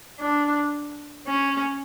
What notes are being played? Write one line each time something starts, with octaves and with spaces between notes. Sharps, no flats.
D4
C#4